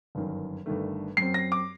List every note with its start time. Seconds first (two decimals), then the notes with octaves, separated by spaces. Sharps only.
0.15 G1 F#2 D#3
0.66 G1 G2 D#3 A3
1.17 F#2 F#3 C4 C7
1.34 A#6
1.52 D6